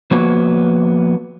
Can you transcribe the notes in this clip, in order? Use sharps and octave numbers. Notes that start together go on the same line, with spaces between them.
F3 A#3 B3 F#4 C#5